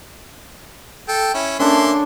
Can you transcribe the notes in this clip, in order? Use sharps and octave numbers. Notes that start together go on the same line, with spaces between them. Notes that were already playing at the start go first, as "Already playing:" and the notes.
A4 G5
C#4 E4
A#3 C#4 D4 A4 E5 C6